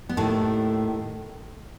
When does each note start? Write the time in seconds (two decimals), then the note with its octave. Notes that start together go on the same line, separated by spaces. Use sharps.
0.09 B3
0.17 D#2 A2 D#3 A3